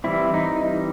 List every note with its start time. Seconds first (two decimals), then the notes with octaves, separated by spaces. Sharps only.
0.04 E3 G3 C4 E4
0.34 D#4